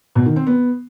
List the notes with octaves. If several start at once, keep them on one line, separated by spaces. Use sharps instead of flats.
B2
D#3
C4
B3